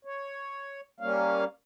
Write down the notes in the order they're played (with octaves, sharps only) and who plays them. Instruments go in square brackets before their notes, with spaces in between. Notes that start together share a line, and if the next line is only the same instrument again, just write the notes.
[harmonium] C#5
G3 A#3 C#4 F5